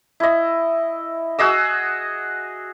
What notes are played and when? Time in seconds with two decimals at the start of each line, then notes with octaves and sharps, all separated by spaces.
0.20 E4 D#5
1.39 F#4 G#4 D#5 E6